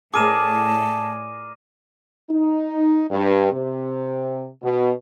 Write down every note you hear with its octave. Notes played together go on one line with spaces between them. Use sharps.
A2 G#4 A#4 D5 A5 D6 D#7 E7
D#4
G2
C3
B2